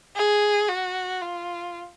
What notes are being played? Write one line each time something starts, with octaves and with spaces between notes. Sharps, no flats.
G#4
F#4
F4